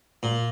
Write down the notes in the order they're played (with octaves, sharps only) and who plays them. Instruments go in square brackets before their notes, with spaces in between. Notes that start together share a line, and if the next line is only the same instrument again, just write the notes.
[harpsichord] A#2